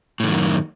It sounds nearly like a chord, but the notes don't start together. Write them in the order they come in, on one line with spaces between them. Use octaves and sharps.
A2 D3 D#3 F#2